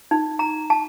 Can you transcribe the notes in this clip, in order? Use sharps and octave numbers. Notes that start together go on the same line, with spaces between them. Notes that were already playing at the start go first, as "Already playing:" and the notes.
D#4
A#5
A5